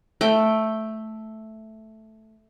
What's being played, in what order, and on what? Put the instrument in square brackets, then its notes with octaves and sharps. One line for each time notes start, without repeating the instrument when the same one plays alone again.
[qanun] A3 G5